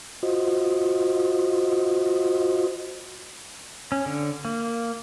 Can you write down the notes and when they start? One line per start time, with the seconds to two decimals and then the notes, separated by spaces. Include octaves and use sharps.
0.23 F4 F#4 C5 D#5
3.92 C#4
4.06 D3
4.45 A#3